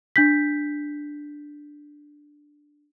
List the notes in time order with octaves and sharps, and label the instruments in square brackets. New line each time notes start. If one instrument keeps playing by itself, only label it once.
[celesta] D4 G6 B6